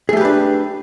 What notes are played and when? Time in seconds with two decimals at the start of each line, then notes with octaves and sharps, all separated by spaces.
0.09 G#4
0.13 A3
0.17 G4
0.21 B4
0.25 D4